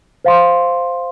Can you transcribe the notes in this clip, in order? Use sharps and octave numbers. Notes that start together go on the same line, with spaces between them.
C5 F5 C6